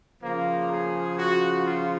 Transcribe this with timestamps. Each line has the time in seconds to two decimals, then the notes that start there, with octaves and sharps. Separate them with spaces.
0.22 C#3 F3 A#3
0.70 G#4
1.17 F#4
1.64 F4